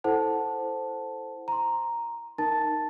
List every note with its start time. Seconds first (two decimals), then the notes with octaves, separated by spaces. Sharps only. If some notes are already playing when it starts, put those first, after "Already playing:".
0.04 E4 A4 C5 F#5 A5
1.48 A#5 C6
2.38 D#4 A#4 A5 A6